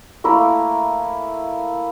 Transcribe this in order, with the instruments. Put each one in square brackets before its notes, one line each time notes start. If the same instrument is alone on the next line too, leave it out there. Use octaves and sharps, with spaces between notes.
[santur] A3 A#3 E4 A#4